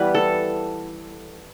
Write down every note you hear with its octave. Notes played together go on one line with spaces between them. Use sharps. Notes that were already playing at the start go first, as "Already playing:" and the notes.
Already playing: E3 G3 B3 B4
A4